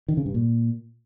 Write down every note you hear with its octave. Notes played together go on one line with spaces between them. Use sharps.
D#3
C#3
G2
A#2